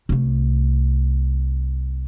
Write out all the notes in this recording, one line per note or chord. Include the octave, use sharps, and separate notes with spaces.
C2 A3